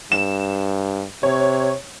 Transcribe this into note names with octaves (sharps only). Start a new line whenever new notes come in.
G2 E7
C3 C#5